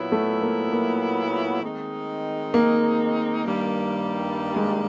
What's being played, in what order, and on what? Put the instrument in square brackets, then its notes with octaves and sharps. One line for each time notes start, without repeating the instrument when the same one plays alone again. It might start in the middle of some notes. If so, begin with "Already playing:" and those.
Already playing: [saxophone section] A#2 F#3 B3 E4
[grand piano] A3
A#3
A#3
[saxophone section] D#3 G#3 C4 D#4
[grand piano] A#3
[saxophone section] G2 D#3 G3 A#3
[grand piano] G#3